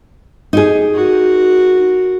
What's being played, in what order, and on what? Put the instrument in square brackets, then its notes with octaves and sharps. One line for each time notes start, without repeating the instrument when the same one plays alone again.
[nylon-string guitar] D#4 G4 G#4
[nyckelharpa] F#4 A#4